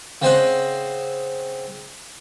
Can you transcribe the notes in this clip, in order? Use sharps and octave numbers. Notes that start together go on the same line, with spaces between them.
C#3 C4 C5 D#5 F#5